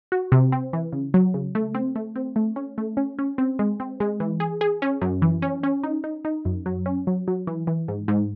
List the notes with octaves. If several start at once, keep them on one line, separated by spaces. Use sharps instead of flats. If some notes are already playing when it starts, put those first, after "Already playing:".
F#4
C3
C4
E3
C#3
F#3
C#3
A3
C4
A3
C4
A3
C#4
A3
C#4
C#4
C4
G#3
C4
G#3
E3
G#4
G#4
C#4
F#2
E3
C#4
C#4
D#4
D#4
D#4
F#2
F#3
C#4
F#3
F#3
E3
E3
G#2
G#2